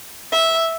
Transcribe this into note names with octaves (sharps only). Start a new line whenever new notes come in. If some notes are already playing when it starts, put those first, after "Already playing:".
E5